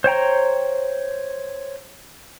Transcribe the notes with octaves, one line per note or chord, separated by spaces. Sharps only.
C5 C#5 G5 A#5